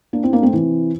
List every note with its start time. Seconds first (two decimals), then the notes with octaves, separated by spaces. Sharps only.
0.13 A#3 D4
0.23 C4 E4
0.33 A#3 D4
0.43 A3 C4
0.53 C3 E3